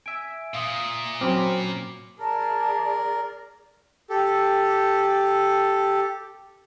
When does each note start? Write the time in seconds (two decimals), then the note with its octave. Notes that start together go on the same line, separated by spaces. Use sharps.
0.06 E5 G#5 D7
0.54 A#2 F5 D#6
1.21 F#3 C4 C#4 B5 D6 F6
2.19 G#4 A#4 D5 A5
4.10 G4 A4